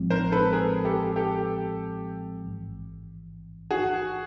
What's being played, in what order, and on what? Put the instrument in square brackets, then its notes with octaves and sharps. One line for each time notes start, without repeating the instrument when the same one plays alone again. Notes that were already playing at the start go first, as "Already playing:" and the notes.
Already playing: [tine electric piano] A1 A2 F3 G#3 C4
[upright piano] A#4 C5
A4 B4
G#4 A#4
G4 A4
G4 A4
[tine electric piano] A1 G#2 E3
[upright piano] F#4 G#4